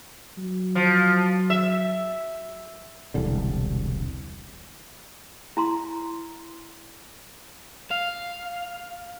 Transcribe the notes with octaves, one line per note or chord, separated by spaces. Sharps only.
F#3
F3
E5
E1 C2 D3
E4 A#5 C6
F5